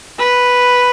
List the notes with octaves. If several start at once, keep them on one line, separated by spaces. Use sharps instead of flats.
B4